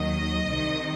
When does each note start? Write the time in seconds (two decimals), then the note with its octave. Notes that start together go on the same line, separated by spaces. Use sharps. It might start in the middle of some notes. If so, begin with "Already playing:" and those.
Already playing: D#2 D#3 F#3 D#5
0.49 C2 C3 D#3